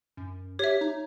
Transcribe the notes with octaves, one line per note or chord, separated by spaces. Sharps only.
F#2
G4 C#5 E5
D#4